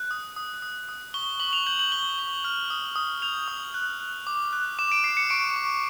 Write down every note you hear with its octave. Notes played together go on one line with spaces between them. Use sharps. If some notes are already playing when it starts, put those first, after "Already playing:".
Already playing: F#6
D#6
D#6
D#6
D#6
C#6 G7
C#6 F#7
F7
G6 F#7
F#7
C#6 G7
C#6
F6
D#6
D#6
G6 F7
D#6
F#6
F#6
D6
F#6
D6 E7
D7
D6 C7
C#7
C#6 D7
C#6